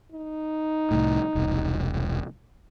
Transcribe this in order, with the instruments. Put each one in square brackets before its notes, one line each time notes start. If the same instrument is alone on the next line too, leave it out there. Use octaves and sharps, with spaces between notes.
[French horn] D#4
[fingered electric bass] C2 A2
E1 C2